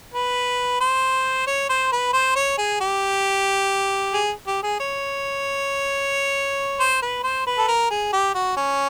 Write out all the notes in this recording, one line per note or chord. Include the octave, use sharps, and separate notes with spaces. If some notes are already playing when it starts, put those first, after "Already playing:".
B4
C5
C#5
C5
B4
C5
C#5
G#4
G4
G#4
G4
G#4
C#5
C5
B4
C5
B4
A4
A#4
G#4
G4
F#4
C#4